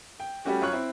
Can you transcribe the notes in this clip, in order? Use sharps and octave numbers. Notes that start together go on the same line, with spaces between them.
G5
G3 A3 C#4 F#4 G4
F#2 F4 C#5 C#6 F#6
C4 E4